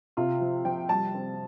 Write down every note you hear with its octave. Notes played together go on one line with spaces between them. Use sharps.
C3 F4
F3
F3 G5
G3 A5
C4